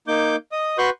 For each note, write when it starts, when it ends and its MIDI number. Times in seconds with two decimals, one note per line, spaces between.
0.07 0.36 58
0.07 0.36 63
0.07 0.36 86
0.07 0.36 91
0.52 0.77 75
0.52 0.77 87
0.78 0.90 66
0.78 0.90 71
0.78 0.90 84
0.78 0.90 85
0.78 0.90 90
0.78 0.90 91